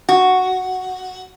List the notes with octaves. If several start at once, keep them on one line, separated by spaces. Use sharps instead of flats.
F#4